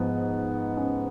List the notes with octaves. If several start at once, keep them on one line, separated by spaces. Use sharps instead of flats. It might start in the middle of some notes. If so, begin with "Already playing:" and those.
Already playing: G#2 F3 B3
C#4